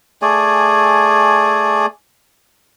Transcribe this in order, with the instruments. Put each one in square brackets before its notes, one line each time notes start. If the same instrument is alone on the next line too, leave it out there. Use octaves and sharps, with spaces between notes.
[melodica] A3 G#4 D5 G#5